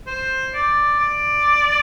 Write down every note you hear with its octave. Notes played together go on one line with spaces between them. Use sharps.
C5
D5
D5